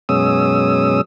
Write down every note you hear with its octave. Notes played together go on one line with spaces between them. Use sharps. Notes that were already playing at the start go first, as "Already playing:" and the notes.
F#2 B2 G#3 C#4 D#6 E6